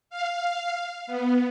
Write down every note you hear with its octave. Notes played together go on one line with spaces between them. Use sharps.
F5
B3